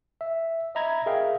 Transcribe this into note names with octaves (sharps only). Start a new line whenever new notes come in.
E5
D#5 E5 A#5 B5 G#6
G#4 A#4 E5 F5 G5